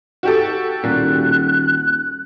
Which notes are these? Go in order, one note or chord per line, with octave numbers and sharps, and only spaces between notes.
F#4 G4 A4
D#1 A#2 F#6